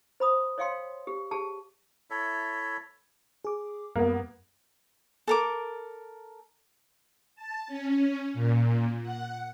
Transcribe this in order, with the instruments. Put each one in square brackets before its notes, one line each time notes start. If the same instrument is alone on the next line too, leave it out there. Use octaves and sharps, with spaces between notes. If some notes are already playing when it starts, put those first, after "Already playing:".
[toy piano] C5 B5 D#6
C#5 D#5 F5 G5 C6
G4
G4 G#4 A5
[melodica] E4 A4 C#5 E5
[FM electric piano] G#4 D6
[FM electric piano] F#2 G3 [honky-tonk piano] A#3 B3
[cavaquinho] A4 A#4 D6
[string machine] A5
C#4
A#2
F#5